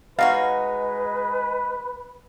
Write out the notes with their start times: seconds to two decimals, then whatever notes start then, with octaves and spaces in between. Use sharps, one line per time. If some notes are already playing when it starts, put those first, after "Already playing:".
0.19 G#3 D#4 F#4 B4 C#5 F5